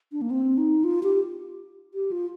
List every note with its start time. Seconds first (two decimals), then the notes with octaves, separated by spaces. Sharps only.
0.12 D4
0.22 A#3
0.30 C4
0.58 D#4
0.84 F4
1.03 G4
1.94 G4
2.12 F4